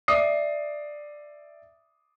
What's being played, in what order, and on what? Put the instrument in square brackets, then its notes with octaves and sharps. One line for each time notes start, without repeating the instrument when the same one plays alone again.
[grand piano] D5 E5 D6 D#6 C7